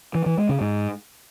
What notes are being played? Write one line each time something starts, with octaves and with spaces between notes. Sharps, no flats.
E3
E3
G#3
C#3
G#2